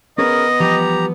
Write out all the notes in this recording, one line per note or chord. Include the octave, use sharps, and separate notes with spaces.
B3 C#4 G#4 A#4 C#5 D#5
E3 F3 G3 G4 A#5